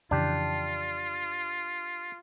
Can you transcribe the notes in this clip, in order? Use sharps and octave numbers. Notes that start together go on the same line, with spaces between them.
F2 C#3 E3 D4 F4 G4